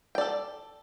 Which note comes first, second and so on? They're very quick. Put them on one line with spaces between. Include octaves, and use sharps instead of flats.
G5 D5 A4